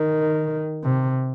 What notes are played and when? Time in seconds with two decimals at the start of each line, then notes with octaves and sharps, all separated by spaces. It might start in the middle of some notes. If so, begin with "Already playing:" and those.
Already playing: D#3
0.84 C3